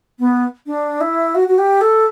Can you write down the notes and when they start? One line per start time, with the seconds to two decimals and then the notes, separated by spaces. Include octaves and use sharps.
0.19 B3
0.66 D4
1.01 E4
1.35 F#4
1.48 F#4
1.58 G4
1.81 A4